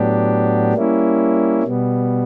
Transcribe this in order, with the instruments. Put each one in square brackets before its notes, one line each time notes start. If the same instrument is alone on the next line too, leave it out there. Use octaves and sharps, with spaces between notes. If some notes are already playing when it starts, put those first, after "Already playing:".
Already playing: [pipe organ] A2 F#3 B3 D4 G4
G3 A#3 C#4 E4
B2 G3 B3